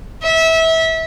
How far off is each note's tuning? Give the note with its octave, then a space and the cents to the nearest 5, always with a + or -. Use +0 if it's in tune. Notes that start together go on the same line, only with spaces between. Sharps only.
E5 -25